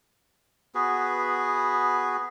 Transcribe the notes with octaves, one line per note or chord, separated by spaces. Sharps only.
B3 F#4 G#4 B4